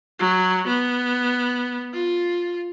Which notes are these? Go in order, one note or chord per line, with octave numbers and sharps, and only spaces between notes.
F#3
B3
F4